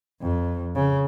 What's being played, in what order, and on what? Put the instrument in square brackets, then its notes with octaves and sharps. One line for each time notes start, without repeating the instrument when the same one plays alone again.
[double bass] F2
C#3